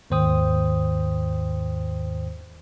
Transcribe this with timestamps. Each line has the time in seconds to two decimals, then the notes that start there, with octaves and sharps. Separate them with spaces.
0.10 D#2 G#2 D#3 C5 G5 D#6